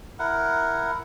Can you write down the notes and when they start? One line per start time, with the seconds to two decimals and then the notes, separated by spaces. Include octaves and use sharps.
0.19 E4 A#4 F#5